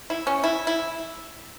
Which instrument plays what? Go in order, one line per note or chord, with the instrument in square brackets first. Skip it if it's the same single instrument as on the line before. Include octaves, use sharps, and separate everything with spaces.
[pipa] E4
C#4
E4
E4